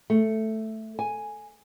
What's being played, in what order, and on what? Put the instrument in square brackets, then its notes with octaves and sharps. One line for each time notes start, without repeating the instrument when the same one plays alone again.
[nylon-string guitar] A3
G#5